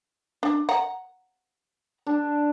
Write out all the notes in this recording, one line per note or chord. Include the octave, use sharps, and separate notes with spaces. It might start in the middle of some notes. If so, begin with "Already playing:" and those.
D4
F#5 A#5
D4